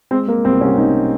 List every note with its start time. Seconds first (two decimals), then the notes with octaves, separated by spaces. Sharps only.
0.11 G#3 C4
0.27 G#3 A#3
0.45 C2 C4
0.61 C2 C#4
0.77 C2 D#4